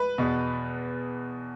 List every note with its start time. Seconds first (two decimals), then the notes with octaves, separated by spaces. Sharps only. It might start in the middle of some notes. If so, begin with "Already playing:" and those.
Already playing: B4
0.18 E2 B2